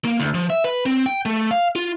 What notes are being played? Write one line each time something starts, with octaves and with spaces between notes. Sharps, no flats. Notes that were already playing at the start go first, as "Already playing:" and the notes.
A#3
D2
F3
E5
B4
C4
G5
A3
F5
F4